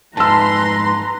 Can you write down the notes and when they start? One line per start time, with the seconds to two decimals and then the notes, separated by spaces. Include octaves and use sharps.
0.17 F2 G#2 B4 A5 A#5 C6 E6